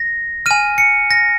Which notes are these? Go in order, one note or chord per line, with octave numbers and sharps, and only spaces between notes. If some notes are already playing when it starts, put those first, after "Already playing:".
Already playing: A#6
G#5 F6 D#7
C#7
A#6